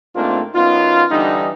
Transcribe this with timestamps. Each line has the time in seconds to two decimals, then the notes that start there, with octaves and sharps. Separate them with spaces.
0.16 G#2 A3 A#3 C4 D4 F4
0.54 F#2 B3 D#4 F4
1.12 D3 E3 G3 D4 D#4